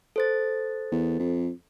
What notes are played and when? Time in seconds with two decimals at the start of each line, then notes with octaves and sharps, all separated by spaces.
0.16 A4 C5 A6
0.92 E2
1.19 F2